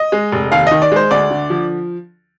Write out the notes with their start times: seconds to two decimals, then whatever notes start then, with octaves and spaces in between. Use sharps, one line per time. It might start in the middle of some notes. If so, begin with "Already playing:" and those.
Already playing: D#5
0.12 G#3
0.32 F1
0.52 D#2 F5
0.67 D#3 D#5
0.82 D5
0.92 G#3 C5
1.11 D2 D5
1.31 D3
1.50 F3